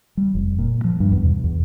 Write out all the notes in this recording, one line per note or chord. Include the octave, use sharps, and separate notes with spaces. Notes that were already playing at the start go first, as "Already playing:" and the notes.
G3
F1
A#2
F3
G2
E2
B2
E2